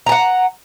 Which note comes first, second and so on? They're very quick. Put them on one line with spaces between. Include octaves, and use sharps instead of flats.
A#5 A5 F#5